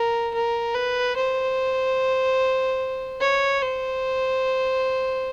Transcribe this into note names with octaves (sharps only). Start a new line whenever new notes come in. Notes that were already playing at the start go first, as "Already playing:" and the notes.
Already playing: A#4
A#4
B4
C5
C#5
C5